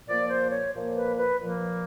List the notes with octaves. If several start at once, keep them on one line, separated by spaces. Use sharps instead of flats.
A#2 F3 A#3 D5
C5
C#5
A#2 F3 A#3
B4
B4
A#2 F3 A#3